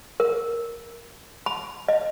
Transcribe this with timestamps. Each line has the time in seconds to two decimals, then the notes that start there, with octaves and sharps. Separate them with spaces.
0.20 A#4
1.46 B5
1.88 D#5